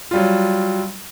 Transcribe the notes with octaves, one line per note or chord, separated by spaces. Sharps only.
F#3 G3 F4